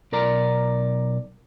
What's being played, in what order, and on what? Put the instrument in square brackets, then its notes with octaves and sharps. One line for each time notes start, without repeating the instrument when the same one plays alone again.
[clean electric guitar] B1 A#4 D5 A#5